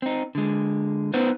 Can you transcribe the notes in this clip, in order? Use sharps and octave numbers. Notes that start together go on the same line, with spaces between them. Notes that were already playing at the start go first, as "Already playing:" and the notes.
C4 D#4
D3 G#3
B3 D#4 B4 C5